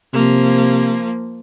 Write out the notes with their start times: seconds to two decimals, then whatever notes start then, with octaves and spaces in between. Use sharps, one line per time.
0.13 C3 F3 A#3